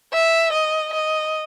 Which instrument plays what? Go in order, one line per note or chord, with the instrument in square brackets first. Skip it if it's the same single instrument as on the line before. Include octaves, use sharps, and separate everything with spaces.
[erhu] E5
D#5
D#5